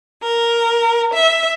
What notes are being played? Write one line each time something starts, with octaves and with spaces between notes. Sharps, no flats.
A#4
E5